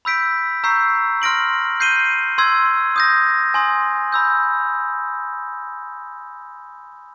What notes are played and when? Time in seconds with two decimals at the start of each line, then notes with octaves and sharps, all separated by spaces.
0.05 B5 E6 G6 B6 D7
0.64 A#5 C#6 E6 G6 C7
1.22 C6 F6 A#6 D7 F#7
1.80 G6 C7 D#7 G7
2.38 C6 E6 G#6
2.96 D#6 G6 A#6
3.54 G#5 C6 D#6
4.13 B5 E6 G6